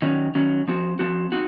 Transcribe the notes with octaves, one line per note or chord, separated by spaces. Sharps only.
D#3 F#3 C#4
D#3 F#3 C#4
F3 C4 F#4
F3 C4 F#4
C4 D#4 F#4